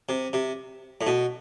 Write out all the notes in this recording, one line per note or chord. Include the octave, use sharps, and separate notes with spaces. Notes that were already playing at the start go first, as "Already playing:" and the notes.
C3
C3
A2
B2